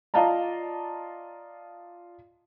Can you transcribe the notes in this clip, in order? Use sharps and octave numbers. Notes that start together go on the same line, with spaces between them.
F4 D5 D#5 F5 A5 A#5